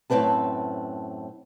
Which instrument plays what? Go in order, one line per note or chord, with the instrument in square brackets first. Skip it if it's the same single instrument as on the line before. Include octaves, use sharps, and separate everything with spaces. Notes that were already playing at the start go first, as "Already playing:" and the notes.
[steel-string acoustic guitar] F#2 A2 F#3 C4 B4 A5